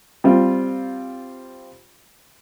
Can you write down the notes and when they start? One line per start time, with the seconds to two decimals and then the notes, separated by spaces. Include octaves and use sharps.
0.24 G3 C4 F4